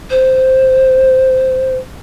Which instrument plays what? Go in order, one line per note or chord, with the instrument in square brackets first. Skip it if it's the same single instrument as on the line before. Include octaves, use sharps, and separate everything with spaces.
[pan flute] C5